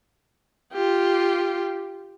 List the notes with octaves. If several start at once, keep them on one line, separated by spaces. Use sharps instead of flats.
F4 G4